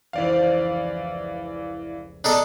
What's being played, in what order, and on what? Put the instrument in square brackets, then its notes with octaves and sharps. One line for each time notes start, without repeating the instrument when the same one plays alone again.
[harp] F1 C#2 [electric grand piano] E3 D5 F5
[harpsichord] D4 D#4 A4